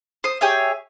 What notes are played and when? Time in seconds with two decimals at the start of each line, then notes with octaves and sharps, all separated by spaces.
0.24 C5 D#6
0.41 G4 G#4 C#5 E5